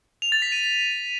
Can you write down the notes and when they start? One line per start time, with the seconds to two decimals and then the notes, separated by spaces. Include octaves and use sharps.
0.22 F7
0.32 A6
0.42 B6
0.52 D#7